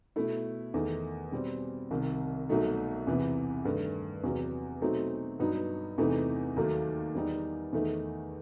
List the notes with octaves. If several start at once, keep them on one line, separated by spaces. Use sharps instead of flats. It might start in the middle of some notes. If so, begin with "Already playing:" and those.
B2 A3 E4
E2 D#3 A3 D#4
B2 G3 C4
C2 C3 D#3
C2 B2 F#3 A3 D#4
E2 C3 E3 B3
G2 D#3 A3
E2 C3 F#3
B2 F#3 A3 C4 D#4
G2 F#3 B3 D#4
E2 C3 E3 A3 D#4
D#2 D#3 F#3 A3
E2 D#3 G3 D#4
E2 D#3 A3 D#4